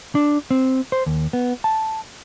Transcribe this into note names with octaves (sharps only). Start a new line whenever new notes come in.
D4
C4
C5
D#2
B3
A5